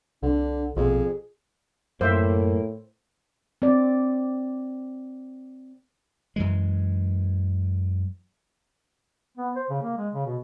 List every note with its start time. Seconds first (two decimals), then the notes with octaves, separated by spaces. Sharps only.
0.23 C2 D3 D4
0.76 A#1 F2 B2 G#4
2.01 F#2 A2 A#3 C5 E5
3.62 C4 D5
6.36 F#2 E3 G#3
9.37 B3
9.56 C5
9.70 C#3
9.82 A#3
9.97 G#3
10.13 C#3
10.26 B2